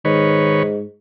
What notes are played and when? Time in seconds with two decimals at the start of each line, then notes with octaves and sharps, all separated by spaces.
0.05 G#2 D#3 B4 C#5